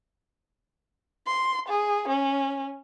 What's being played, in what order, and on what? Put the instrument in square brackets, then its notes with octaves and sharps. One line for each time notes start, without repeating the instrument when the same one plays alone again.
[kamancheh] C6
G#4
C#4